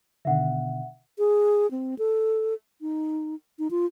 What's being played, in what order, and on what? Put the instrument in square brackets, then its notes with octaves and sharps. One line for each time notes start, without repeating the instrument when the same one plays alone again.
[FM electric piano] B2 D3 D#3 [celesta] E5 F#5
[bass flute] G#4
C4
A4
D#4
D#4
F4